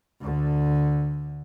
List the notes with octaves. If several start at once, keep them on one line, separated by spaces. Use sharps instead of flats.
D2 D3